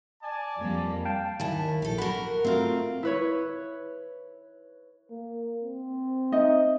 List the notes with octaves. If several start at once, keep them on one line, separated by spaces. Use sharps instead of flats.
D5 G#5 A5
F2 G3 A#3
F5 G5 A5
D#2 D#3 E4 G#5 A5
A#1 G4 A4
F#4 A#4 B5
A3 C4 F4 F#4 A#4
E4 B4 C#5
A#3
C4
D#4 D#5 E5